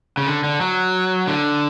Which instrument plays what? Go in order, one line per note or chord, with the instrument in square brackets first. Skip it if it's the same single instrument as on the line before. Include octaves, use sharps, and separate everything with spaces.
[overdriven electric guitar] C#3
D3
D3
F#3
D3